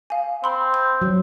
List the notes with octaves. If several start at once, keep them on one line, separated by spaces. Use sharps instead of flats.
F5 G#5
C4 B5 C6
G6
F#3